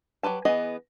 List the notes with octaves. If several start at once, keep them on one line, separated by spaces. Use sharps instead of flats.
F#3 G4 B4 A5
E3 B3 G#4 D#5